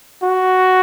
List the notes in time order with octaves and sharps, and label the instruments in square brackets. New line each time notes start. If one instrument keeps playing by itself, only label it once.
[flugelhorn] F#4